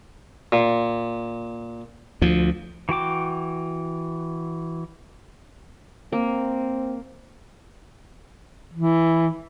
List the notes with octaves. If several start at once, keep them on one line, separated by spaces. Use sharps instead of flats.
A#2
D2 F3
E3 F#4 G5 D6
A#3 C4
E3